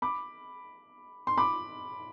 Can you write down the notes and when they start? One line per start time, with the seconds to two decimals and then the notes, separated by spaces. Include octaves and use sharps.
0.02 B5 D6
1.27 C6
1.38 B5 D6